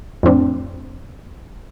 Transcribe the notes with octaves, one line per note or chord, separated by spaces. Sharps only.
F2 A2 C4 D4